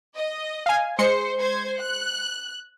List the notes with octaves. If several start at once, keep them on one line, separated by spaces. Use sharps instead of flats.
D#5
F5 G#5
G#3 C5 C6 C#7
C5 G#6
F#6